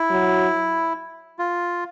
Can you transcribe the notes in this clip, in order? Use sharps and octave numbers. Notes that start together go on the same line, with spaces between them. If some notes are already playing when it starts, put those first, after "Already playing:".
Already playing: E4
F#3
F4